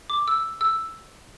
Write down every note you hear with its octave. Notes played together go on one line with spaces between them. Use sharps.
D6
E6
E6